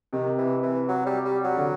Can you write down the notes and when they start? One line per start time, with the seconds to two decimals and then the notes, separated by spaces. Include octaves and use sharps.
0.13 C3 D#3
0.38 E3
0.63 E3
0.88 F#3
1.06 G3
1.25 G3
1.44 F#3
1.57 D3